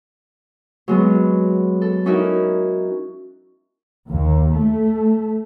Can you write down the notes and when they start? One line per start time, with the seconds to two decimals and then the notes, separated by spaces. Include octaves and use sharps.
0.88 F#3 G#3 B3
1.81 A4
2.06 C#4 D#4 E4 F#4 A#4
4.09 D#2
4.54 A3